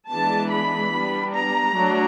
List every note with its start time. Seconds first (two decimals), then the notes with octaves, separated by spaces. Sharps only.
0.11 E3 G#3 B3 D4 A5
0.52 B5
0.92 G3 B3 D4
1.34 A#5
1.75 F#3 A3 D4